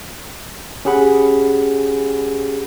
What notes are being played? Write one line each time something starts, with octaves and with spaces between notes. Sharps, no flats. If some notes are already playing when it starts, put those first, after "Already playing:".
C#4 G4 G#4 F#5 B5